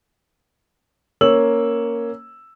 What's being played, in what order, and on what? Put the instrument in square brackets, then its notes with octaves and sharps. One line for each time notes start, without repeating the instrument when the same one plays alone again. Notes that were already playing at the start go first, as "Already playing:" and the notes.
[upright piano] A#3 C#4 C#5 E6 F#7